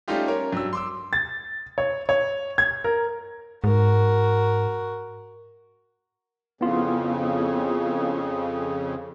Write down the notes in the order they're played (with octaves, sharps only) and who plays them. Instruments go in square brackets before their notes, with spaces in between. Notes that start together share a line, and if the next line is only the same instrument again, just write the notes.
[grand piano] G3 A3 C#4 D#4 F4 G4
C#4 A#4 C#5
G2 F#3 E6
C6 D6 E6
A6
C#5
C#5
G#6
A#4
[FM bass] G#2 [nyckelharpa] F#4 A#4
[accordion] F2 C#3 [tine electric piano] B3 E4 F4